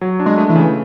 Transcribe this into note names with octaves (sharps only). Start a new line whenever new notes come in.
F#3
D4
G#3
A3
E3
C#3